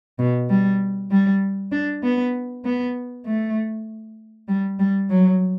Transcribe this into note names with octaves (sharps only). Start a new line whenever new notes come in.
B2
G3
G3
D4
B3
B3
A3
G3
G3
F#3